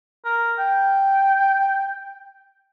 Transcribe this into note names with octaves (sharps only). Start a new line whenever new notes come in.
A#4
G5